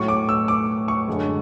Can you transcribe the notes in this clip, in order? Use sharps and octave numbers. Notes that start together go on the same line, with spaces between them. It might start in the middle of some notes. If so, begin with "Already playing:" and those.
Already playing: A2 F#3 C#6
D6
E6
D6
C#6
F#2 D3 G#3